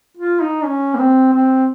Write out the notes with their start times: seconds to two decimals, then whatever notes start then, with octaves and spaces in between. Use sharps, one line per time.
0.17 F4
0.41 D#4
0.64 C#4
0.94 A#3
0.99 C4
1.33 C4